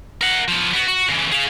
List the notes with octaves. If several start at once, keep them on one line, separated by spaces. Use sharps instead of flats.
A#4 F#5
F3 B3
B3 F#4
F#4
C#3 E3
G#4 F5